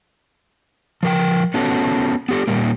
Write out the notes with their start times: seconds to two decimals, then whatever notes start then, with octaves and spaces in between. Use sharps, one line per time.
1.03 F3 A#4 G5
1.54 B3 C#4 F#4 A4
2.29 B3 G4 A4
2.48 A#2 G3 A#3